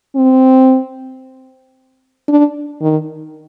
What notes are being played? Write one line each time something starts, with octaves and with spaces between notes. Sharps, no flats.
C4
D4
D#3